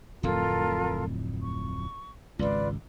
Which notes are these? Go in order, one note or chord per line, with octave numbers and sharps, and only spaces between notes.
D1 F2 A2 F4 A4 A#4
C#6
G#1 C#2 F4 B4 D5